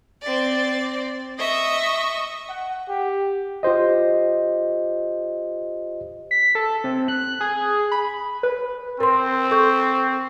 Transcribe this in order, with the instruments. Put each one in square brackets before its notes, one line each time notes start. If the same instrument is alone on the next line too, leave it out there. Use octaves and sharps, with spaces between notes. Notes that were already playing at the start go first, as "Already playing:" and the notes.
[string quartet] C4 D5
D#5 E5 C#6
[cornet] F#5
G4
[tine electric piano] F4 G4 C5 D#5
[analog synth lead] B6
A4
C3
F#6
G#4
[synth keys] B5
B4
[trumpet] C4 [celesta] A#4 C6
[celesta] A4 C#6 G6